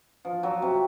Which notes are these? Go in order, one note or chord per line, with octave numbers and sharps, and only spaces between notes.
F3
F#3
C3